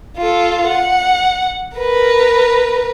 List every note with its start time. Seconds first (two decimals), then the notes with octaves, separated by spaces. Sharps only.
0.18 F4 A4
0.68 F#5
1.78 A#4 B4